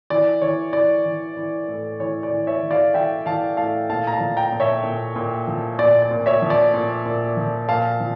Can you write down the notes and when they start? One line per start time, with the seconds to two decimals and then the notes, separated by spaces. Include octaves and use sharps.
0.10 E3 D5
0.42 E3 C#5
0.73 E3 D5
1.06 E3
1.37 E3
1.68 A2
2.00 E3 C#5
2.23 D5
2.32 E3
2.47 C#5 E5
2.63 E3
2.71 D5 F5
2.94 E3 E5 G5
3.26 E3 F5 A5
3.57 A2 F5 A5
3.90 A#2 F5 A5
4.07 A#5
4.13 F5 A5
4.20 F3
4.37 G5 A#5
4.52 A#2
4.60 C#5 E5
4.84 A#2
5.16 A#2
5.47 F3
5.79 A#2 D5
6.02 D5
6.11 A#2
6.26 C#5 E5
6.42 F3
6.50 D5
6.74 A#2
7.05 A#2
7.37 F3
7.68 A#2 F5 A5
8.00 F3